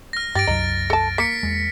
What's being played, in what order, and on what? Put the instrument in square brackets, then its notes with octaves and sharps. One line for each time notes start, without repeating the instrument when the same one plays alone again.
[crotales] F6 A#6
[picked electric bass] G2 [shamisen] G4 [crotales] A6 A#6 D7
[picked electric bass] C2 F#2 F#3 [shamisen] D#4
[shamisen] A4 A5
[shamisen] A#3 [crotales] B6 C#7
[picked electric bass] E2 G#3